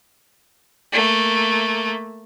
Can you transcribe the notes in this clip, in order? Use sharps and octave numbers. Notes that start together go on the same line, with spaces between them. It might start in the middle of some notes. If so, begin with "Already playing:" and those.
A3 A#3